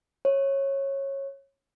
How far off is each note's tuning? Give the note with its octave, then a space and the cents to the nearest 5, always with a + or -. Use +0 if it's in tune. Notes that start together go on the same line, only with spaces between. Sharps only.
C#5 -15